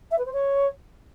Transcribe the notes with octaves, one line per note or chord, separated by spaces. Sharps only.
E5
B4
C5
C#5